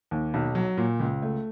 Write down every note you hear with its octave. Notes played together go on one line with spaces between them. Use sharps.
D#2
B1
F#3
A#2
C#2
A3